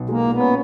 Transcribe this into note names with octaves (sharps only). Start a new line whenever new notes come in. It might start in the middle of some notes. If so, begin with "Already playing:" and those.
Already playing: B1
G#3 A#3
A#2
B3
C#4